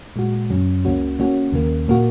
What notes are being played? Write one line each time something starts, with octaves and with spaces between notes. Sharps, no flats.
A#2 G#3 F#4
F#2 C#3 F#3 C#4
C#2 C#3 A#3 C#4 F#4
C#3 A#3 C#4 F#4
D#2 C#3 A#3
A#2 A#3 F#4